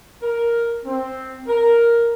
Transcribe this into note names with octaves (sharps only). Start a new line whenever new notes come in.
A#4
C4
A#4